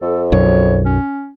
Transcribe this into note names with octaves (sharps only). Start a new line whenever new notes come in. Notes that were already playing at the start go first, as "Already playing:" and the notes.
F2 A4
B1 F#2 C#5
C#4